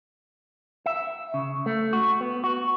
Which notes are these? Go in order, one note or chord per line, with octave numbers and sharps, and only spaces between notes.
E5
C#3
A3
F#4
B3
F#4